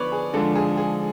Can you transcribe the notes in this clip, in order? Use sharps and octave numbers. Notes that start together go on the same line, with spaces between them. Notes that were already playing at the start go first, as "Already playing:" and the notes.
Already playing: D3 F3 B3 B4 C#5 D5
G#4
D3 F3 G#3 D4 A4
G#4
G#4